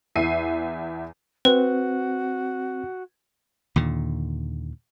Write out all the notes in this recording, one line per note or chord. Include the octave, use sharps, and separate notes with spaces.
E2 E5 C7 D#7
C4 F#4 B4
D#2 A#2 D3